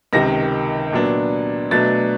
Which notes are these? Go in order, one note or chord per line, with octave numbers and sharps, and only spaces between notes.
C#2 C3 D#3 A#6
A#2 F#3 B3 D4
B2 F#3 A3 D4 A6